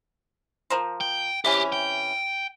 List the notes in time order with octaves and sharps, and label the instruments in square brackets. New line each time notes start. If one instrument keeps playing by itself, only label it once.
[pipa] F3 A#4 C5
[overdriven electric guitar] G5
[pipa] C3 E3 C#4 [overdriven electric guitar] G4
[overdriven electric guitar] G5